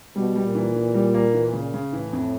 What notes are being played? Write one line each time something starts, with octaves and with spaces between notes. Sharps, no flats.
B2 G3
G3
A#2
E3
E3
G3
A#3
E3
C#3
C#3
A2 E3
F2